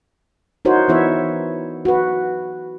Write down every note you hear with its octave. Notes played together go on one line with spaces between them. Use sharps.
D#4 E4 F#4 A#4 C5 C#5
E3 B3 E4 C#5 E5
F#4 B4